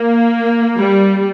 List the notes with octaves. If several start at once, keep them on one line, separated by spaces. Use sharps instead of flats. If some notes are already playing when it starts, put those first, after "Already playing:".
Already playing: A#3
G3